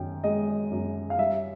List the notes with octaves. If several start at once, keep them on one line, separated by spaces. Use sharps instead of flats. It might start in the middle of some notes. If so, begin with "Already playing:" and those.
Already playing: F#2 D#3 G5
G#3 D#5
F#2
F5
G3 E5